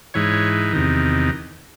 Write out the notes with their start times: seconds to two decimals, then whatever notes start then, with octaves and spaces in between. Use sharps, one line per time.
0.14 G#2 E3 C#5
0.73 E2 C3 D#3